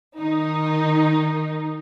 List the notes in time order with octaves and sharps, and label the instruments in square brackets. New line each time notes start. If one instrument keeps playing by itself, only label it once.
[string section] D#3 D#4